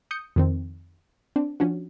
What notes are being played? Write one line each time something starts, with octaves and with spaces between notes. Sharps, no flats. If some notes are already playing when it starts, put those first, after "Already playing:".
D#6 G6 C#7
F2 D#3 C4
C4 D4
F3 C#4 D4 F#4